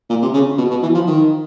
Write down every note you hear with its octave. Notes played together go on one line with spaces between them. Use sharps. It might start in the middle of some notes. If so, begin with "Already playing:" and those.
A#2
C3
C#3
B2
B2
E3
F3
D#3